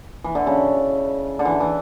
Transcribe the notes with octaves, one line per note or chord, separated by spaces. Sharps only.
E3
D3
C#3
D3
E3
E3